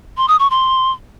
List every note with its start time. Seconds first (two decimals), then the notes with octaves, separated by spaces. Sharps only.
0.17 C6
0.28 D#6
0.39 C#6
0.50 C6